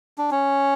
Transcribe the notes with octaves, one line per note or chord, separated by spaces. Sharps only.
D4
C#4